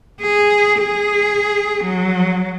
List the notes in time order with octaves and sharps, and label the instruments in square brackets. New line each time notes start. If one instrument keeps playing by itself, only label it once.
[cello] G#4
G#4
F#3